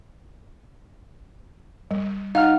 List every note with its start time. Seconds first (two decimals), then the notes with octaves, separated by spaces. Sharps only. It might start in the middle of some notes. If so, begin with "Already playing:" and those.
1.91 G3
2.35 D#4 F5 F#5 F6